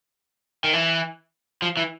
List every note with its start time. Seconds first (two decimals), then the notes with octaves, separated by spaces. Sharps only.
0.64 D#3
0.73 E3
1.62 F3
1.77 E3